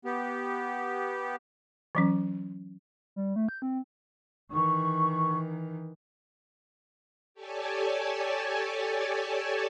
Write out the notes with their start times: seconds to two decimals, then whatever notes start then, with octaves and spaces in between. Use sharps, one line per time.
0.05 B3 G4
1.95 E3 F#3 C#4
3.16 G3
3.36 A3
3.49 G6
3.62 C4
4.51 D#3 E3 C#6
7.34 G4 A4 C#5 D5 G#5 A5